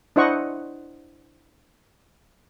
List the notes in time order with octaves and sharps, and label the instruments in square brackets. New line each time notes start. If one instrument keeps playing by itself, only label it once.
[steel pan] D4 E4 C5 D#5 F#5 C#6